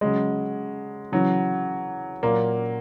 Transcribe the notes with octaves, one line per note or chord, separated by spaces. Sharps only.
C#3 F#3 G#3
C#3 E3 F#3
A#2 F#3 A#3